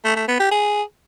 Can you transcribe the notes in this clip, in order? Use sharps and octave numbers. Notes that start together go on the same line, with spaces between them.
A3
A3
B3
G4
G#4